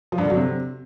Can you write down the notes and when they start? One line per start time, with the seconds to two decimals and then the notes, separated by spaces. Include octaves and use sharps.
0.12 F3
0.18 G2
0.24 D3
0.30 F#3
0.36 C3